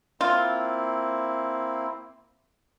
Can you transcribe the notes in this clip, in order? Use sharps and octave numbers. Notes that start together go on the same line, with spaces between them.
A#3 C4 E4 F4